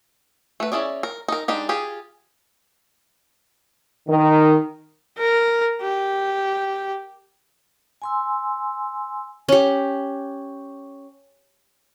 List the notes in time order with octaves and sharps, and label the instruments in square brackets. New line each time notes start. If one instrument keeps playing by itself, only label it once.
[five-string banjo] A3 B4
C#4 E4 F4 G#4 D5
A#4
D#4 A#4
G#3 D4 D#4 G4
F4 G4 G#4
[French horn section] D#3
[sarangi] A#4
G4
[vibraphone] G#5 C6 E6
[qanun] C#4 G4